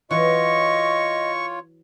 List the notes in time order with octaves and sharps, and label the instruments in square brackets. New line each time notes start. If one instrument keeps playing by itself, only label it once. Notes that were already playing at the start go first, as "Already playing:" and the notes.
[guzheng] E3 F#3 [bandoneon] F4 C#5 [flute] D#5 [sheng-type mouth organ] C#6